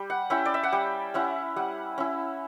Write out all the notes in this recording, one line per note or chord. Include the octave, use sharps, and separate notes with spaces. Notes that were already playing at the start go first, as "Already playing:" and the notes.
Already playing: G3
F#5
C#4 E4 G5
D5
E5
F#5
G3 G5
C#4 E4 F#5
G3 F#5
C#4 E4